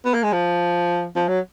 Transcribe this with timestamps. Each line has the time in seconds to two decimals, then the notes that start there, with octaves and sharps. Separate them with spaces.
0.05 B3
0.14 A#3
0.23 G#3
0.33 F3
1.16 F3
1.28 F#3